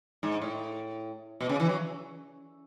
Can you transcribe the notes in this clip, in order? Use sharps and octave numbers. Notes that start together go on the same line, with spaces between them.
G#2
A2
B2
C#3
E3
F#3